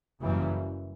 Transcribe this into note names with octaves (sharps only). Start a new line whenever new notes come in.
F#1 F#2 C#3 E3 G3